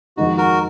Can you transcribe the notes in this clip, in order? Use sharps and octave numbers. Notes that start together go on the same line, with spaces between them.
F2 D#3 G#3 D#4 F#4
F#4 A#4